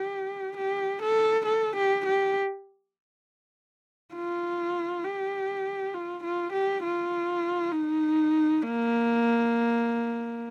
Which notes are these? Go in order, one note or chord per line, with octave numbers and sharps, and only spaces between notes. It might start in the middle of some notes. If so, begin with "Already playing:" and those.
Already playing: G4
G4
A4
A4
G4
G4
F4
G4
F4
F4
G4
F4
D#4
A#3